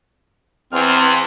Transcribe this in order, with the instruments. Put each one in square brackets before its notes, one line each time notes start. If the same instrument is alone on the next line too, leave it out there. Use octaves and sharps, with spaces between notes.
[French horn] E2 [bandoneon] C4 F6